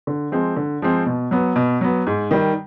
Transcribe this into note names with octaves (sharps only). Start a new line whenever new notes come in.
D3
F3 G#3 C4
D3
F3 G#3 C4
B2
F#3 B3
B2
F#3 B3
G#2
D#3 G3